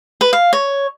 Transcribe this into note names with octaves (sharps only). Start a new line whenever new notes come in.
B4
F5
C#5